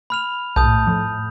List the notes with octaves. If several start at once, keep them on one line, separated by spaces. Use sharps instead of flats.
B5 F6 F7
B1 A2 A5 D#6 G6
F2